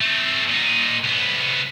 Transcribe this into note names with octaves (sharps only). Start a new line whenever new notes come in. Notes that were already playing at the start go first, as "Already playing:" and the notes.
A3 C4
A#2 D#4
C2 B3